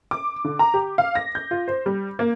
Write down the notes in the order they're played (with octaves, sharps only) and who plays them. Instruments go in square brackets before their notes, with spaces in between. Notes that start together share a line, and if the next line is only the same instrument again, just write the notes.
[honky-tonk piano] D6
D3
A#5
G4
F5
A#6
G6
F4
C5
G3
A#3